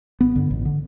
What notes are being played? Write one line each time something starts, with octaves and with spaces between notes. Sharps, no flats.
A1 B3
G2 D3
A1
D3